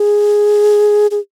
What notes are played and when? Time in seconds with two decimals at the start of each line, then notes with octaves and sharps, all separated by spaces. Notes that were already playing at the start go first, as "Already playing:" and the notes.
Already playing: G#4
1.11 G#4